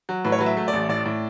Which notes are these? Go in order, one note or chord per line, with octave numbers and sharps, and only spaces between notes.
F#3
A2 B4
C#5
F#3 B4
E5
A3
D5
A1
A2 D5
A2